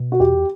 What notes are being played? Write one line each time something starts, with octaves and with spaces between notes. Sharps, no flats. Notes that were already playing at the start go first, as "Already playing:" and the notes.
Already playing: B2
F#4
E2 G4